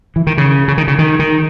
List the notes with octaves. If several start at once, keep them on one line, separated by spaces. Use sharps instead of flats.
E3
D#3
C#3
C#3
D#3
C#3
D#3
D#3